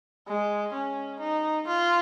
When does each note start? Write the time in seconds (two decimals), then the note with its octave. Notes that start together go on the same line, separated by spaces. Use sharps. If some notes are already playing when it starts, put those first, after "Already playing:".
0.28 G#3
0.73 C#4
1.20 D#4
1.68 F4